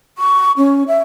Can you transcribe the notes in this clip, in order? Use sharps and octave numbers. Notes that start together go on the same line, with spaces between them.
C#6
C#4
E5